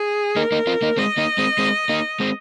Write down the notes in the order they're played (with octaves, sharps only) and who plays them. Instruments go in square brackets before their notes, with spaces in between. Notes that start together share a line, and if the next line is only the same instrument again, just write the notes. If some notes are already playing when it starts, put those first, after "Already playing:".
Already playing: [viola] G#4
[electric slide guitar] A#3 D#4 [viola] A#4
[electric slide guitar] A#3 D#4
C4 F4
A#3 D#4
[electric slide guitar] G#3 C4 [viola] D#5
[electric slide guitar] A#3 D#4
G#3 C4
G#3 C4
A#3 D#4
G#3 C4